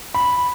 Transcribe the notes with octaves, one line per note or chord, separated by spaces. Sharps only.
B5